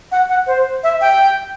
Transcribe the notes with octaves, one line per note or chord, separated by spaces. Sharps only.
F#5
F#5
C5
E5
G5